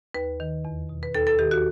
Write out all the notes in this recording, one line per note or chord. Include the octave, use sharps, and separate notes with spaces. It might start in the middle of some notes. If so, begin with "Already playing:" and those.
D#2 B4
D#3
E2
B2
B4
D#2 A4
A4
D#3 G4
F#4